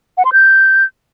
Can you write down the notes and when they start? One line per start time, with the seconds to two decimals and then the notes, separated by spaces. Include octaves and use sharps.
0.18 F#5
0.25 C6
0.33 G6